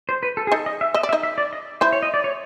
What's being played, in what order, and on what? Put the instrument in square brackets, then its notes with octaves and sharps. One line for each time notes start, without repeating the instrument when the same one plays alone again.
[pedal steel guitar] C5
B4
A4
G#4
[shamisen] D#4 D#5 [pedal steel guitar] A4
[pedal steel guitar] D#5
E5
[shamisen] D#5 [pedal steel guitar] E5
[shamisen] D5
[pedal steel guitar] E5
[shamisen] D#4 D#5
[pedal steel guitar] E5
D5
D#5
[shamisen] E4 E5 [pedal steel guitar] C5
[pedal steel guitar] C#5
D#5
D5
C#5